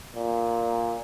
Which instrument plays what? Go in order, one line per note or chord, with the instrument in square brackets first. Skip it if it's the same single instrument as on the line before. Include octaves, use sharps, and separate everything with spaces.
[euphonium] A#2